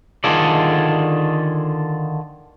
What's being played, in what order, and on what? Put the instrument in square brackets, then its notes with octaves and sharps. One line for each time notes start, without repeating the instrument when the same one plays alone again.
[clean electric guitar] D3 D#3 F4 G#4 A4 D5